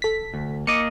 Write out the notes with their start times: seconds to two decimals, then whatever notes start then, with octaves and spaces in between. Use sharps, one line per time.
0.02 A4 B6
0.34 D2
0.67 A#3 D#5 D6 C#7